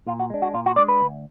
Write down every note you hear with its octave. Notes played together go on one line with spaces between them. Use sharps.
A#2 F4
F#4
G#3 D4
F#4
A#2 F4
F#4
G#3 D4 D5
B4
D2